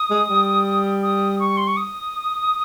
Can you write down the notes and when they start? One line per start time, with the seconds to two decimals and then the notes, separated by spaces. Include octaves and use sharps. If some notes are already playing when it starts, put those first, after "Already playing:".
Already playing: D#6
0.10 G#3
0.30 G3
1.03 D#6
1.40 C#6
1.57 C6
1.67 C#6
1.77 D#6